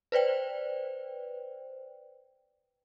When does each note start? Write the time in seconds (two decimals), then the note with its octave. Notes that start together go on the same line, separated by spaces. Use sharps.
0.12 B4 C5 D5 G5